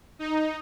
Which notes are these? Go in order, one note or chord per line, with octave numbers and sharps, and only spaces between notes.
D#4